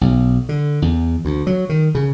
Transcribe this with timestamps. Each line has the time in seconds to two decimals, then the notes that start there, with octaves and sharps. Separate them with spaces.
0.01 B1
0.49 D3
0.82 E2
1.25 D2
1.47 F#3
1.69 D#3
1.95 C#3